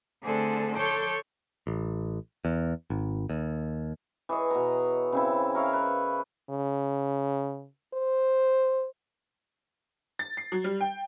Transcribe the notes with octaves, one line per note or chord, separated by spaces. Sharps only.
D3 A3 C4 D4 G#4 A4
A4 C#5 C6 D6 G6
A1
E2
G#1
D#2
E3 G#4 C#5 D#5
B2 A#5
C#3 C4 E4
A#4 C#5 E5 F5
B4
C#3
C5
A6
C7
F#3
G3
G5